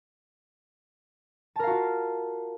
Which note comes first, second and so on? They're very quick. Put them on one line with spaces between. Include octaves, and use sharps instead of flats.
A5 A#4 F5 F#4 F4